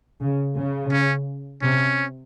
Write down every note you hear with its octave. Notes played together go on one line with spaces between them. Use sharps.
C#3
C#3
C#4
C3 C#4